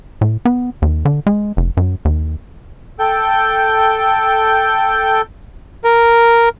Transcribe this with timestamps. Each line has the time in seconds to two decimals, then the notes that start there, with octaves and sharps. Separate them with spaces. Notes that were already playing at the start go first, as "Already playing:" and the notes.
0.21 A2
0.45 B3
0.82 D#2
1.05 D3
1.27 G#3
1.57 F1
1.77 F#2
2.05 D#2
2.99 A4 G5 G6
5.84 A#4